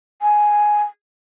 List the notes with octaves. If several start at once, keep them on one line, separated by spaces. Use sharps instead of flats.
G#5